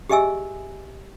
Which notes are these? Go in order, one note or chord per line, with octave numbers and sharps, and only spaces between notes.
G4 G#4 D#5 E5 G#5 E6